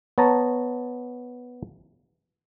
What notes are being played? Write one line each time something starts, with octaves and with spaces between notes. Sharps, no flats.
B3 C#5 A5 A#5